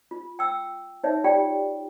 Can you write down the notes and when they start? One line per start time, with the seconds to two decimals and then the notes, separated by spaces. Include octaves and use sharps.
0.11 F4
0.39 G5 E6
1.03 D#4 C#5 E5
1.24 F4 G4 D5 G5